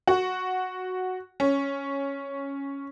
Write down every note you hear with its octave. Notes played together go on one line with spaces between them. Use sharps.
F#4
C#4